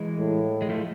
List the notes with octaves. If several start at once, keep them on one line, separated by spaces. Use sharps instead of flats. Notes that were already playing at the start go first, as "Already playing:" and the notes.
Already playing: E3 G#3
A2
G#3
F3 A3